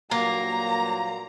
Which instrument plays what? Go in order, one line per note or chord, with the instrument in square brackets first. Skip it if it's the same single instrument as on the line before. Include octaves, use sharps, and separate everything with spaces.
[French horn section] G2 A#2 F#3 [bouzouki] A#3 [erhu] A#5